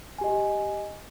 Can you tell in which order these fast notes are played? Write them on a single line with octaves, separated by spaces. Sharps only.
G#5 G4 D#5